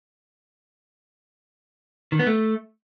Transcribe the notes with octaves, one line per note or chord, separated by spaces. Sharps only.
D#3
B3
A3